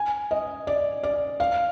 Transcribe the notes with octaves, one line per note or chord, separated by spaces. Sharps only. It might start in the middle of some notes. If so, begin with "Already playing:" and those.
Already playing: G#5
D#5
D5
D5
F5